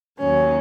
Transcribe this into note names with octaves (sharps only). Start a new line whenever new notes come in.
D#2 D#3 F#3 C#4